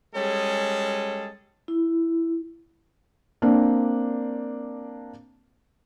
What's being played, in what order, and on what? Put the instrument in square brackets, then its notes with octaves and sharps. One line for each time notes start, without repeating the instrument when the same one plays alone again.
[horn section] G3 G#3 C#4 G#4 A4
[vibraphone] E4
[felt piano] A#3 C4 D4